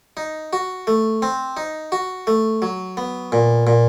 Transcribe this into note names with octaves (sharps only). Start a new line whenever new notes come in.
D#4
F#4
A3
C4
D#4
F#4
A3
F#3
B3
A#2
A#2